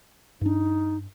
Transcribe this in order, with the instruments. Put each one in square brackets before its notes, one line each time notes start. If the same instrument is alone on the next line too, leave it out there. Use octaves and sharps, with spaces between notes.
[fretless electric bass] G2 D4 [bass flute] D#4